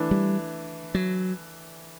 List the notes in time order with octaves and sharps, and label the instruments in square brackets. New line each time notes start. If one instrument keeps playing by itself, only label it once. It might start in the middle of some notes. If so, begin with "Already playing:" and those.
Already playing: [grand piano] E3 A3 D4
[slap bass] G3
F#3